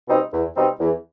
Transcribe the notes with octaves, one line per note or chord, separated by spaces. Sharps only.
B2 G3 C4 D#4
E2
B2 G3 C4 D#4
E2